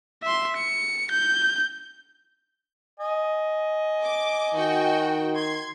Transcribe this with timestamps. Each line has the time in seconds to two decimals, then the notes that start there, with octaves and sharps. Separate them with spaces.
0.23 E5 C6
0.57 C#7
1.12 G6
3.00 D#5 G#5
4.04 D6
4.54 D#3 F#4 G5
5.35 C6 G#6